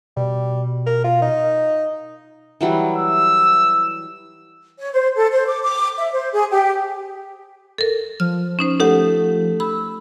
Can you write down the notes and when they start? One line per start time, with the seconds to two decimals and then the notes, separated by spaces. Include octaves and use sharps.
0.17 B2 G3
0.86 A#4
1.04 F4
1.22 D#4
2.61 E3 F#3 G3
2.97 E6
4.78 C#5
4.92 C5
5.15 A4
5.31 C5
5.46 D6
5.62 D6
5.96 E5
6.12 C5
6.32 G#4
6.51 G4
7.78 A4 A#4
8.20 F3 F6
8.59 C#4 D#4 C5
8.80 A3 D#4 G4 F#5
9.60 B5 E6